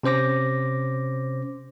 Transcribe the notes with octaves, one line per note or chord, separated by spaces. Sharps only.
C3 C#4 C5 D6 A#6